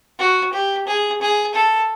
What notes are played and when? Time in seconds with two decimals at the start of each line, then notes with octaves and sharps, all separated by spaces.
0.19 F#4
0.53 G4
0.87 G#4
1.22 G#4
1.54 A4